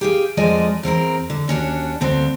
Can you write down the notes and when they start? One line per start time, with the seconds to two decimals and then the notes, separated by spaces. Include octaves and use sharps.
0.01 G4 G#4 F5
0.37 F2 G#3 F4 D5 D#5 G#5
0.83 E2 C4 A4 A#4
1.30 D3
1.48 D#2 C#4 D4 F#4
2.01 D2 B3 C4 F5